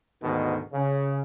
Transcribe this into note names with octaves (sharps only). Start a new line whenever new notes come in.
D2 G#2 B2 D#3
C#3